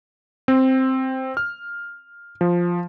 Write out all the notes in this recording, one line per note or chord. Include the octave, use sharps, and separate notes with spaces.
C4
F6
F3